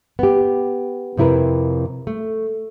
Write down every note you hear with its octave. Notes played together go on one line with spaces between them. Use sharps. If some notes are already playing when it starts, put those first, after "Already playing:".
B3 G4
F2 C3 E4 A#4 B4
A3